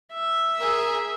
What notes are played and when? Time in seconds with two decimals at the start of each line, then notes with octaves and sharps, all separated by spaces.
0.13 E5
0.58 G#4 A#4